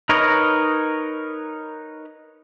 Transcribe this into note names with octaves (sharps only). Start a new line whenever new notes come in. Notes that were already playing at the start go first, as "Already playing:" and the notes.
D#4 A#4 B4 C#5 D#5